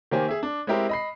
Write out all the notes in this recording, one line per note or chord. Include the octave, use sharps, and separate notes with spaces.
D#3 A#3 G4 C5 G#5
G#4 E5
D4
G#3 C4 E4 G4 A#4 C5
D#5 B5 C7